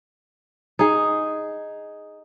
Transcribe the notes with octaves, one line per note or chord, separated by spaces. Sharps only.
D#4 G#4